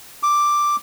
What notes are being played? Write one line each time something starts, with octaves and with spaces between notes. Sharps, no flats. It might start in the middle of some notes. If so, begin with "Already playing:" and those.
D6